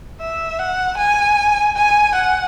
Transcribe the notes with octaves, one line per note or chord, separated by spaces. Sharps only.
E5
F#5
G#5
G#5
F#5